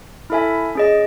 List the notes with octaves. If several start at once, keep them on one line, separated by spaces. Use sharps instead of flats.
E4 A4 E5 G#5
C#4 G#4 D#5